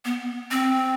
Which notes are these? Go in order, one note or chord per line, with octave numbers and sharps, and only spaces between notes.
B3
C4